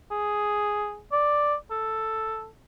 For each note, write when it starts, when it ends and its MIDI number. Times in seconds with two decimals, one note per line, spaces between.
0.11 0.99 68
1.12 1.55 74
1.71 2.48 69